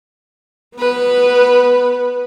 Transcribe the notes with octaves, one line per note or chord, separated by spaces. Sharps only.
B3 B4